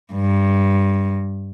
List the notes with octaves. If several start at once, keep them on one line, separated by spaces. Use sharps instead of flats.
G2